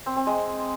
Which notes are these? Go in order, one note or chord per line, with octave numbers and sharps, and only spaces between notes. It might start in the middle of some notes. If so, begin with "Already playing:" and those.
C4
C4
G#3